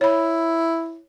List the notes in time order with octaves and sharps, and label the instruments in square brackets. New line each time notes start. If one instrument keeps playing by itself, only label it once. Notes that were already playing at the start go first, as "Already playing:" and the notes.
[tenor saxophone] E4 [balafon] C#5 B5